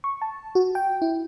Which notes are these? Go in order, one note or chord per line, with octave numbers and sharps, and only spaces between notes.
C#6
A5
F#4
G5
E4